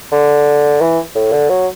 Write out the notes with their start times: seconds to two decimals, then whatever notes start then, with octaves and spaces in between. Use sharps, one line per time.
0.12 D3
0.81 E3
1.15 A2
1.33 D3
1.50 F#3